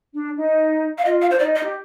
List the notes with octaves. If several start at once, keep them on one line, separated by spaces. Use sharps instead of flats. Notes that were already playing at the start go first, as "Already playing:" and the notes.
D4
D#4
F5
F4 D#5
F5
D4 C5
D#4 D5
D#5
G4